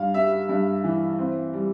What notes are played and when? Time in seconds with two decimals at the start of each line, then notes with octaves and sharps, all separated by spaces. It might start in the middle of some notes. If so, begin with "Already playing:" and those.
Already playing: G2 F5
0.14 G3 E5
0.49 G2
0.84 E3
1.19 C4
1.53 G3